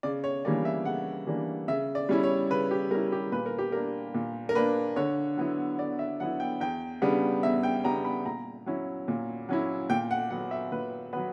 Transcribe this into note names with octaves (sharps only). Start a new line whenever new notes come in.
C#3 D5
C#5
E3 G3 A#3 D4 D5
E5
C#3 F#5
E3 G3 A#3 D4
C#3 E5
D5
G3 C#4 E4
C#5
C#3 B4
G4
G3 C#4 E4 A#4
G4
A#2 B4
A#4
G4
A#3 D4 A#4
A#2
A#4
A#3 D4 B4
D3 C#5
F#3 B3 E4
D3 D5
E5
F#3 B3 E4 F#5
G5
E2 G5
C#3 G3 B3 D4
E2 E5
G5
C#3 G3 B3 D4 A#5
B5
A#2 A#5
F#3 C#4 E4
A#2
F#3 C#4 E4
A#2 G5
F#5
F#3 B3 F#5
E5
A#2 B4
F#3 B3 B4